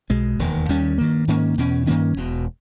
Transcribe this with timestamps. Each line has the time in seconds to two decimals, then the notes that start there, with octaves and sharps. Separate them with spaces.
0.10 B1 B2 G#3
0.39 E1 D#2 D#3
0.69 D#2 D#3 G3 C#4
0.98 G2 D#3 A#3
1.28 G#2 D#3 A#3 C#4
1.57 E2 B2 A#3 C#4
1.87 G2 D#3 A#3 C#4
2.17 E1 E2 B2